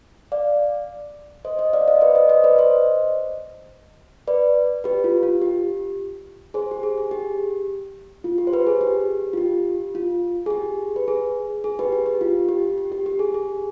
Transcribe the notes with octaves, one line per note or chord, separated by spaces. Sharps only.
D5 F5
C5 D#5
C5 D#5
D5 F5
C5 D#5
B4 D5
C5 D#5
C5 D#5
B4 D5
C5 D#5
B4 D5
G4 B4
F4
F4
G4
G#4 C5
G4
G#4
G#4
G4
F4
G4
C5
G4 B4
G#4
G4
F4
G4
F4
G#4
G4
B4
G#4
G#4
G4 B4
G4
G4
F4
G4
G4
G4
G4
G#4
G#4